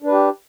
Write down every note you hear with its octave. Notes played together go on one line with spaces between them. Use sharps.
D4 G4 B4